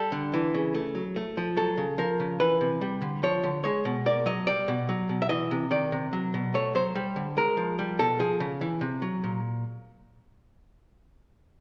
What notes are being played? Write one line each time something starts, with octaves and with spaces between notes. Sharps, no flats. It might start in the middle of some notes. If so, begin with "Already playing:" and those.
Already playing: G3 A4
D3
E3
C#3
A3
F#3
A3
F3
F#3 A4
C#3
F3 A#4
C#3
E3 B4
C3
G3
D3
F3 C#5
D3
G#3 C#5
B2
A#3 D5
F#3 D#5
G3 D5
B2
F#3
B2
E5
E3 D#5
C3
D#3 D5
C3
F#3
B2
A3 C#5
F#3 C5
G3
D3
G#3 A#4
F3
G3
B2 A4
F3 G#4
C#3
E3
C3
F#3
A#2